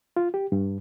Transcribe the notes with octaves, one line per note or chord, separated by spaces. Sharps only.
F4
G4
G2